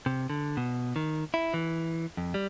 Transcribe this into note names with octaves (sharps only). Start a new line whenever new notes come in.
C3
D3
B2
D#3
E4
E3
F2
G3